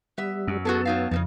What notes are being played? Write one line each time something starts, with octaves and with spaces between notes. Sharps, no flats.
G3 B3 E5
F#2
B3 F#4 G#4 A4 A5
F#3 D#4 F5
F2 C#3 E3 D#4